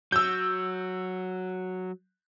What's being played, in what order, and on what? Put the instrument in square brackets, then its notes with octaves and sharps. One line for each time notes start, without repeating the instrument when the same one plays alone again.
[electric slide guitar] F#3 [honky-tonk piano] E6 G6